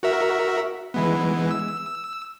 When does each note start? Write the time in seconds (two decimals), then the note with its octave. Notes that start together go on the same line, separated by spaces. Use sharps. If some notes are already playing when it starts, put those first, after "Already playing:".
0.03 F#4 A#4 E5
0.94 E3 G#3 B3
1.51 E6